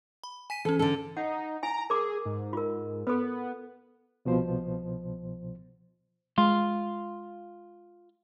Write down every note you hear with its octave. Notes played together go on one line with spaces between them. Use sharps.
B5
G#5 B6 D#7
E3 C#4 A4
D3 A4
D#4 F#5
E4 G#5 A#5
G#4 A#4 D6
G#2
F4 A#4
B3 A4 B4
C2 B2 F3 C5
G#3 F4